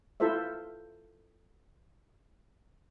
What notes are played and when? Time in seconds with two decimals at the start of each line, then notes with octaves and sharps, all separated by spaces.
0.20 E4 F4 A4 C5 E5